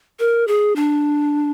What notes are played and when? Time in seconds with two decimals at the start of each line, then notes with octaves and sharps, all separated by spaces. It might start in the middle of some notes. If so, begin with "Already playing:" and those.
0.19 A#4
0.48 G#4
0.76 D4